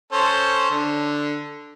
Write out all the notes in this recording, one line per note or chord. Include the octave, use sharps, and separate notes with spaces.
C#4 A4 C5
D3